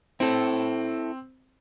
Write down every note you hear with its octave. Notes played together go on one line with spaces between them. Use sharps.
C4 E4 A4